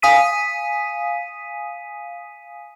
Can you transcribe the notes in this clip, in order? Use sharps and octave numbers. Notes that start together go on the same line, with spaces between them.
F5 G#5 D#6 B6 D#7